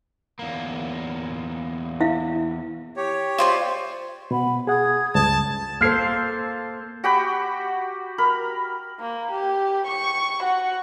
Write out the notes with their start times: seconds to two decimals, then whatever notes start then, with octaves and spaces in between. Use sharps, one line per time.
0.39 E2 A#3
2.00 E4 E5 F5
2.97 G4 C#5
3.38 F4 C5 D5
4.31 B2 F#5 B5
4.67 G#4 F#5 D#6 G#6
5.15 C#2 G2 A5
5.81 A#3 A4 C5 F6 G#6 C7
7.04 F#4 G4 G5 B5
8.18 A#4 B5
9.00 A#3
9.32 G4
9.87 C#6
10.44 F#4